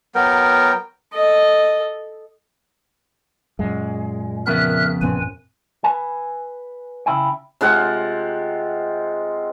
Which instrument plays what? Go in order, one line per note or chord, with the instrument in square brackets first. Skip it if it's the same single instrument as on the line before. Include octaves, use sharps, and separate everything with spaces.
[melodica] F#3 B3 A#4 G5
[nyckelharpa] A4 D#5
[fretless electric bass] F#2 [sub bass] A#2 [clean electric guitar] G#3
[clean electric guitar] F2 C#3 B3 [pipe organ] A#4 E5 F#6
[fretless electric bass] A1 A#2 C4 [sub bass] F#2 [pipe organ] B4 G#5
[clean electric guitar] B4 G#5
C#3 E4 G5
[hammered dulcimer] C3 G#3 F4 F#5